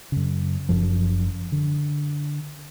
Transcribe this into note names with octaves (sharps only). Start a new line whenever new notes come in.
F#2 C#3
F#1 F#2 F3
D3